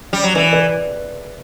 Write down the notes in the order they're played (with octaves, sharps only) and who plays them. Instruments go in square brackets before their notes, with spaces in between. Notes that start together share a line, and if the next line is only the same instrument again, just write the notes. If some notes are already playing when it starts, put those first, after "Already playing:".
[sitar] G3
F#3
[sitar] E3 [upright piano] B4 D5
[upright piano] B4 D5